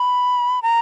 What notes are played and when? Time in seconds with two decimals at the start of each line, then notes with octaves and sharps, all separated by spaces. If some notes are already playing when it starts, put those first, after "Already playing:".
Already playing: B5
0.63 A#5